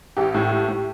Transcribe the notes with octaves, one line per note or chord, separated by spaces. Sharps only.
A1 G4
A2
A3
A2